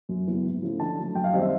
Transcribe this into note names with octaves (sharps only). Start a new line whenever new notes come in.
F#2
C#3 F#3 B3 E4
G#2
F3 A3 C#4 E4
D3 A5
F#3 A3
F#2 G5
F5
D#3 G3 C4 D#5
E5